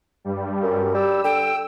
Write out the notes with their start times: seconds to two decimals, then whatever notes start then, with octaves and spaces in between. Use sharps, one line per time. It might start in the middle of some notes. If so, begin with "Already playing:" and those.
0.24 G2 G3
0.63 F#2
0.94 G3 E6
1.24 D3 G5